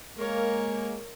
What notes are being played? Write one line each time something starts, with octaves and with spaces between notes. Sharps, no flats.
G#3 A#3 A#4 C#5